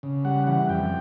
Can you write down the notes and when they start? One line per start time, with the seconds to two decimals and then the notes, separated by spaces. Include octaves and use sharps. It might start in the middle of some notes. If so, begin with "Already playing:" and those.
0.03 C#3
0.25 G3 F#5
0.47 E3 F#5
0.69 F2 G5